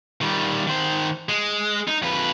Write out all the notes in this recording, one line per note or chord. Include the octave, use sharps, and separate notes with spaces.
D#3 G3
D#3 C5
G#3
D#4
F2 B4